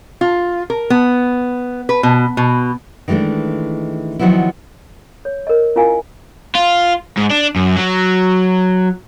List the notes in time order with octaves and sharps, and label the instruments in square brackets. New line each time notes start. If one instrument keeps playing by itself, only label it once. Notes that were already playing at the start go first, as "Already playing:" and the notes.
[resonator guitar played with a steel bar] F4
A#4
B3
B4
B2
B2
[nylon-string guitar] D#3 E3 G#3 A3 D4
D#3 F3 F#3 B3 E4
[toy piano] C#5
A#4 D#5
C#4 E4 F4 A#4 F5 G#5
[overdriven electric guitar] F4
G#2
D4
F#2
F#3